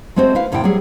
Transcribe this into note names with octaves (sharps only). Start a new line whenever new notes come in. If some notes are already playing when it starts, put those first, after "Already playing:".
G#3 A3 C4 F#4 C5
E4 B4 F5
D2 A2 C3 E4 F#5 G5
F#3 G3 G#4